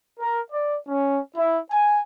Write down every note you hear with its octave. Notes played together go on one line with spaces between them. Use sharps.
A#4
D5
C#4
E4
G#5